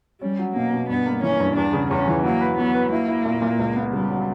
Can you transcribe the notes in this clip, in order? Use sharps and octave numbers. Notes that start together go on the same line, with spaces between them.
G3 C#4
F#3
B2 A#3
B2
G2 B3
A#3
E3 C#4
G2
E2 D4
C#3
E2 C#4
E3
F#3 A#3
B4
F#3 B3
B4
A#3 E4
E4
A#2
A#2
C#2
B3
C#3 G3
F#3